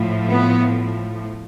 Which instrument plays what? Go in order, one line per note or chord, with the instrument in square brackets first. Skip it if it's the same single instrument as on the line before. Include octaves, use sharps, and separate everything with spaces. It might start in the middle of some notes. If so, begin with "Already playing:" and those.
Already playing: [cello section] A2 F3
B3